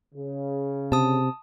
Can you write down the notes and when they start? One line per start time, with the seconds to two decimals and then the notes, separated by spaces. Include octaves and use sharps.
0.15 C#3
0.92 C3 A5 D#6